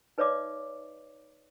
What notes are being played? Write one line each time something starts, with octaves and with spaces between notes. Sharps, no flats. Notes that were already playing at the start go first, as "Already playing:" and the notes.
D#4 B4 C#5 D5 E5 D6